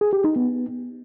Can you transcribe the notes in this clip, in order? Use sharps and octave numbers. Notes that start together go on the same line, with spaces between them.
G#4
G4
D#4
B3